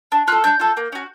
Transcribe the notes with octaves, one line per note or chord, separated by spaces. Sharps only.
D4
F4 A4 F#6
D4 G6
F4 A4
A#3
C#4 F#4